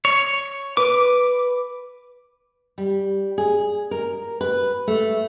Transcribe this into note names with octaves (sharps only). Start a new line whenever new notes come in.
C#5
B4 D6
G3
G#4
A#4
B4
A3